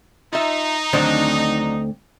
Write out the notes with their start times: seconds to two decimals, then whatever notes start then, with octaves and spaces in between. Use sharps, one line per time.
0.32 D#4 F4 E5
0.93 D2 D#3 F#3 C4 D4